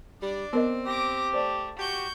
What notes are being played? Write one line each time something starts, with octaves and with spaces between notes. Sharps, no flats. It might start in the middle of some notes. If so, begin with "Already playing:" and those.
G3 D4 D5
B3 C4 A#4 D#5
G4 D6 A#6
A3 C5 D5
F#4 G4 C#6 G6